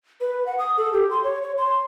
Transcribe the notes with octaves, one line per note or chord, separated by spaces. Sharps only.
B4
F#5
D#6
A4
G4
C6
C#5
C#5
C6